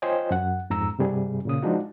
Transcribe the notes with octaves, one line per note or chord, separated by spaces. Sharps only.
F4 C5 C#5 D#5 G5 G#5
F#2 F#5
F2 G#2 A#5 E6
G2 C3 G3 G#4
A#2 C#3 D#6
F3 G#3 D4 D#4 F#4